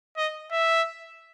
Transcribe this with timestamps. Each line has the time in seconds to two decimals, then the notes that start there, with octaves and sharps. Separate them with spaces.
0.17 D#5
0.52 E5